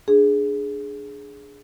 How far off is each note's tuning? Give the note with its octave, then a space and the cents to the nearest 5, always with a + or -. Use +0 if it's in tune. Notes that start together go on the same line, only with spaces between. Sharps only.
D4 +0 G#4 +5